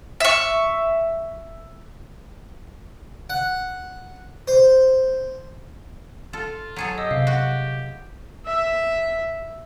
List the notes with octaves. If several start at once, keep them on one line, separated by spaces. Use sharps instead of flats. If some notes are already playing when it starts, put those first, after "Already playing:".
E5 C#6
F#5
C5
F4 A4
F#3 G#4 A4
G4 D#5 D#6 E6
C3 F5
F#4
E5